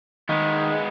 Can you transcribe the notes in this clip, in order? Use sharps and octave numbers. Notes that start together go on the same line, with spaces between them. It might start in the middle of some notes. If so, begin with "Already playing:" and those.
D#3 G#3 B3